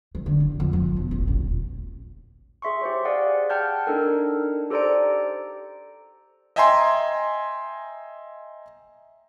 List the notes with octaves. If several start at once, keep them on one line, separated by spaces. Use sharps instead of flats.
E3
D3
A1
F2
F3
E1
A1
D#1
G#4 E5 C6 C#6
G4 C5 C#5
G#4 D5 F5 F#5
F#5 G5 A5 F6 G6 G#6
D4 D#4 A4 A#4
G4 A4 C5 D5 A#5 D7
D#5 E5 G5 G#5 A#5 C6